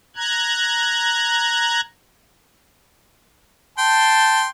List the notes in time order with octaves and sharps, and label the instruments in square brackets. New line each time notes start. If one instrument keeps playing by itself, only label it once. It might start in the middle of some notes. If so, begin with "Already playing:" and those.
[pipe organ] A#5 F#6 G#6
[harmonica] G5 C6 [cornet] A5